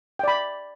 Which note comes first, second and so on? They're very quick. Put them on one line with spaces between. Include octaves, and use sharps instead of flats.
G5 D5 B5